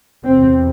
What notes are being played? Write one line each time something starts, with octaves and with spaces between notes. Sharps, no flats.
E2 C3 C4